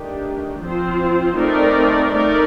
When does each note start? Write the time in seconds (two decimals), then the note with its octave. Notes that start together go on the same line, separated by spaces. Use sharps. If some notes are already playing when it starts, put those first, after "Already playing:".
Already playing: D#3 A3 D4 G4
0.62 F3 C4 F4 C5
1.38 A3 C4 D#4 A#4 D5
2.14 A3 D#4 A#4 D5